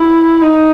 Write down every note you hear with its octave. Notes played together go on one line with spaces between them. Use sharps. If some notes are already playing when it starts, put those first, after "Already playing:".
Already playing: E4
D#4